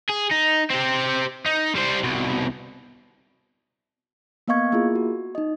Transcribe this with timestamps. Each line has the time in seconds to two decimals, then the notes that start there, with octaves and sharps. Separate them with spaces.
0.10 G#4
0.31 D#4
0.71 C4 G4
1.46 D#4
1.75 G3 C5
2.04 C2 B2
4.48 A#3 B3 D#5 F5 C#6 G#6
4.72 A#3 E4 F4 G#4
4.95 F#4
5.35 D#4 D#5